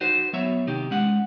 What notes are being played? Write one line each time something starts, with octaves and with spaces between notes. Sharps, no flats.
D#4 F#4 B4 C5
F#3 B3 C#5 E5 A#5
C3 D#3 D#4 G4
G#3 C#4 F#5